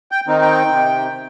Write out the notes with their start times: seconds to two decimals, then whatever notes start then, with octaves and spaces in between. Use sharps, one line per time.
0.11 G5
0.27 D#3 C4 D#4
0.41 G5
0.71 C3